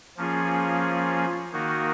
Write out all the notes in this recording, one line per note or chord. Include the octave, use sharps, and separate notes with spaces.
F3 A#3 C#4 F4 G#4
D#3 A#3 D#4 F#4 A#4